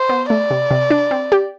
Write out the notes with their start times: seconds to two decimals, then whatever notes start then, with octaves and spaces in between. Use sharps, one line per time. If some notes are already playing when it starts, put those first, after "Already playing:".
Already playing: C5
0.09 B3
0.29 A3 D5
0.50 C3
0.71 C3
0.90 D4
1.11 C4
1.32 G4